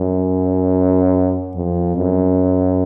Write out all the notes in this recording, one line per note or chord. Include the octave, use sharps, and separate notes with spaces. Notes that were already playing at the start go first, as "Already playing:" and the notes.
Already playing: F#2
F2
F#2